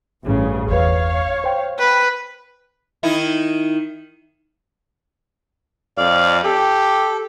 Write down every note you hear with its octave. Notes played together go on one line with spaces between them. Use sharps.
A1 G2 C#3
G1 E2 B4 C#5 F5
C5 G5
B4
D#3 D#4 E4
F2 D5 F5
G4 A4